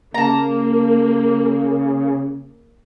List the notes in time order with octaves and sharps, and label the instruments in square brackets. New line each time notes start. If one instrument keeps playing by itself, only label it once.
[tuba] C#3 [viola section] A#3 [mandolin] A5 A#5